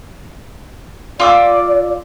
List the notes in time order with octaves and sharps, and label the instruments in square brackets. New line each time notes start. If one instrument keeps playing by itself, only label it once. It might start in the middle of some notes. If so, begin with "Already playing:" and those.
[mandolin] F4 D6 E6 [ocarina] D5